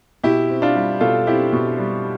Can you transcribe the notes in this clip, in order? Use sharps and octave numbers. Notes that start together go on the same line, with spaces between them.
B2 E4 G4
C4
D4 F4
G3
B2 F4 A4
C4 E4 G4
B2
G3